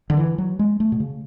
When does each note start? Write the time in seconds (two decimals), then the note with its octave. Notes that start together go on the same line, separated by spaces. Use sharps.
0.10 D3
0.17 E3
0.38 F#3
0.59 G#3
0.80 A3
0.92 B2
1.00 C#3